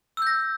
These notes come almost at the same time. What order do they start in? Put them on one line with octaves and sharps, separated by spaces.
E6 G6 A#6